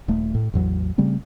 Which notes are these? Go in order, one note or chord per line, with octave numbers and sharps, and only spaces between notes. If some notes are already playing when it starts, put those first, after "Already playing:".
D#1 A3
A2
A1 E2 F#3
C#3 G3 A3 C4